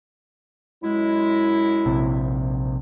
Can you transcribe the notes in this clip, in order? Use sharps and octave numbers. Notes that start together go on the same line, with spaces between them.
F#2 G#3 E4
A#1 C3